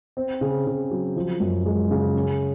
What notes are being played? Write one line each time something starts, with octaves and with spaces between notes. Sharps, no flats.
C4
C#3
C#3
F#3
F3
F#2
G#3
C#3
C#4